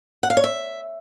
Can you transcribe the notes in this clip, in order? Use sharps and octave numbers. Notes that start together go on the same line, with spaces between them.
F#5
F5
C#5
E5